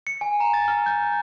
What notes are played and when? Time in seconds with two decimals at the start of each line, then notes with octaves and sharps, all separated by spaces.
0.07 C#7
0.21 G#5
0.40 A#5
0.54 A6
0.68 F6
0.86 G6